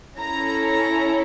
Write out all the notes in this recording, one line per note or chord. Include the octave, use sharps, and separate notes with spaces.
C#4 E4 A4 A#5
A#5